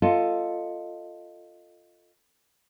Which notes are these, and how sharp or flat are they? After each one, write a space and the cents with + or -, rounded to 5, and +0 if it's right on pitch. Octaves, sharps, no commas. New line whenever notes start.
F4 +0 A4 +15 D#5 +0